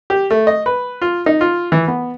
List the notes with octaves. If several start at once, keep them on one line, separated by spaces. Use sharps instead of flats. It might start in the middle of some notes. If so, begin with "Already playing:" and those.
G4
A3
D#5
B4
F4
D#4
F4
E3
B3